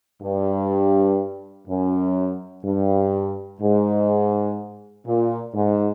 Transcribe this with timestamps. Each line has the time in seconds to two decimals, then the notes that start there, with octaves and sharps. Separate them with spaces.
0.23 G2
1.68 F#2
2.65 G2
3.61 G#2
5.06 A#2
5.54 G#2